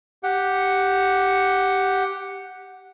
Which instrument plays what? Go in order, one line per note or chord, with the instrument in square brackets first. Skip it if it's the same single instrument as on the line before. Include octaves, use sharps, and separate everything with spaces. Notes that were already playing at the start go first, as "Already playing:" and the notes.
[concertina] G4 F#5